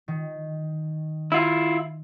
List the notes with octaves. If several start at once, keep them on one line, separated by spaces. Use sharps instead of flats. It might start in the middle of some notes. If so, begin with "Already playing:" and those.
D#3
E4 F4